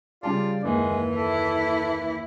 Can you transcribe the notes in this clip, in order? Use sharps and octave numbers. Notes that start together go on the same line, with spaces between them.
C#3 G3 F4 D5 A5
F#1 D#2 E3 G#3
E4 A4